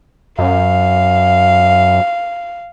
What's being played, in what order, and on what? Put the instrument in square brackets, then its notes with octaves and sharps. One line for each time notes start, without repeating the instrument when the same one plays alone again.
[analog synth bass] F#2 [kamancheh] F5